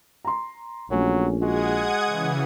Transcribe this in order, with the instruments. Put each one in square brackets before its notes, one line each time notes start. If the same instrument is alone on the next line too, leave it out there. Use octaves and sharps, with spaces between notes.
[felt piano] A#5 C6
[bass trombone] A#1 [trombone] F#3 [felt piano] A3 C#4
[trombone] G#3 [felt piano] F#4 [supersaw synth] F#5 D#6 G#6
[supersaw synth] C#3 E3